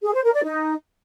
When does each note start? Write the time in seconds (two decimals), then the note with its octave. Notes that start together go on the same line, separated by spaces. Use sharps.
0.03 G#4
0.14 C5
0.24 A#4
0.34 D5
0.44 D#4